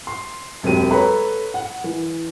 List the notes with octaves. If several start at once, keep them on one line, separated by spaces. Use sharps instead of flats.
C6
E1 F#2 C4 F#4 G4 D#7
A4 B4 C#5 A#5 B5
F#5
E3